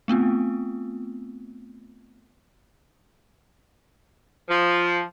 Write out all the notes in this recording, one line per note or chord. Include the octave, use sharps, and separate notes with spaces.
A3 B3 C4 F4
F3